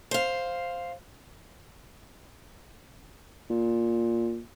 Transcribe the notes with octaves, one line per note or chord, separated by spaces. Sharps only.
C5 F5
A#2